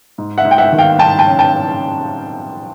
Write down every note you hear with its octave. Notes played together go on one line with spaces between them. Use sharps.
G#2
E5 F#5
G#2
G5
E5 F#5
D#3
F5 G5
G#2 G5 A5
G5 A5
C#4
G5 A5
C#4